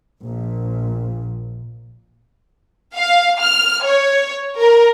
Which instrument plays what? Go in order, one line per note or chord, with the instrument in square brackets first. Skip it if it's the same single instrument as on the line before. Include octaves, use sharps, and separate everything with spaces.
[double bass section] A#1 A#2
[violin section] F5
F6
C#5
A#4